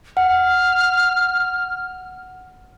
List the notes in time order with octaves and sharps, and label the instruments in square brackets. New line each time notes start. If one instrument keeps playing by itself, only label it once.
[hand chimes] F#5 [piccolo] F6